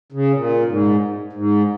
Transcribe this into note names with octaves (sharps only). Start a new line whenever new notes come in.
C#3
A#2
G#2
G#2